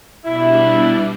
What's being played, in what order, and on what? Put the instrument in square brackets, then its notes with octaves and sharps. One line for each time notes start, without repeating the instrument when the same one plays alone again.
[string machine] B2 G3 D4 [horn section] E4